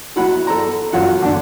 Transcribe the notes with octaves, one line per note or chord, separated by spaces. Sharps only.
F#3 E4 F#5 B5
A4 A#5
F#2 F4 F#5
D3 D4